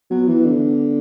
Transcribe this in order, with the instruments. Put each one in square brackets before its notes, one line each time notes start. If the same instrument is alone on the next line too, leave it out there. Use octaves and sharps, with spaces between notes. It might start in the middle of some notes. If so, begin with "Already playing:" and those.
[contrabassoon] F#3 [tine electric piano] B3
[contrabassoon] E3
D3